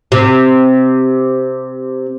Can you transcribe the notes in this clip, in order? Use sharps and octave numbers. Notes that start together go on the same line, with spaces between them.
C3